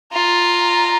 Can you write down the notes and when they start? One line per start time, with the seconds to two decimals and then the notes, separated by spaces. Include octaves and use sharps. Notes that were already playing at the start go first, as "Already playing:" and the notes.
0.13 F4 A#5